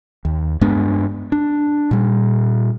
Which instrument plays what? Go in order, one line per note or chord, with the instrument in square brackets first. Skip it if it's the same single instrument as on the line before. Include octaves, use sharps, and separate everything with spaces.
[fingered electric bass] D#2
G2 G#3 B3 D4
D4
A#2 G3